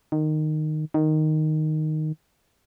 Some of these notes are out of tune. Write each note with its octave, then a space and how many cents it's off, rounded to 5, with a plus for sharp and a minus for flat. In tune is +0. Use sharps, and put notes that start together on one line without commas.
D#3 -15
D#3 -5